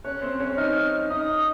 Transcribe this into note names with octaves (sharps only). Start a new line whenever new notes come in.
C#4 C#5 F#6
C4 C5
C#4 C#5
D#4 D#5 F6
D#4 D#5 D#6